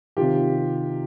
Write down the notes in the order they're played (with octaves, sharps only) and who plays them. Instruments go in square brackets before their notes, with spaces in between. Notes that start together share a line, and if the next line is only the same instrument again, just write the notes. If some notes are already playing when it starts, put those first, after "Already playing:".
[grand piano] C3 D#3 F4 G4